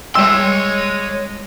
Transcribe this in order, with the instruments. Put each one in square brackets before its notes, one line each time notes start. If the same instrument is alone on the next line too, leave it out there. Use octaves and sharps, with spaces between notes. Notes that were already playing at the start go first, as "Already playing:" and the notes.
[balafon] G3 G5 [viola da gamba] G#3 [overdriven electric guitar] C#5 C6 [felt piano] E6